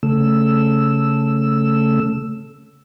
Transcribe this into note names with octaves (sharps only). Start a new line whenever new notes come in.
C#3 A3 E6